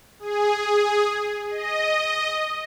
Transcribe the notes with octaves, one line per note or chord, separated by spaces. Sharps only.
G#4
D#5